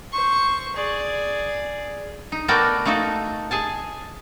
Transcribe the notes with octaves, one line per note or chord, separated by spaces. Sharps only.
C5 C#6
G#4 D5
D#4
A3 B3 F#4 A#4 D5 G5
A3 A#3 D#4 F#4 A4
G#4 G#5 A5